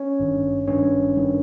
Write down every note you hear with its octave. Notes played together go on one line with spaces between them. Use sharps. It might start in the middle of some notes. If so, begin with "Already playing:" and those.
Already playing: C#4 C#5
G#1 G2 D#3
G#1 G2 D#3 C#4 C#5
G2 D#3